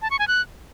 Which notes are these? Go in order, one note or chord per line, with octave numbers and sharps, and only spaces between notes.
A5
C#6
G#5
F#6